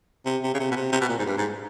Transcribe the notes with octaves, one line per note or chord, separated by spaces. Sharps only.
C3
C3
C#3
C3
B2
C3
C3
B2
A#2
G#2
G2
G#2